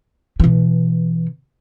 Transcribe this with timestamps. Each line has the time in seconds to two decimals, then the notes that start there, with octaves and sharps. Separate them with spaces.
0.40 B2 E3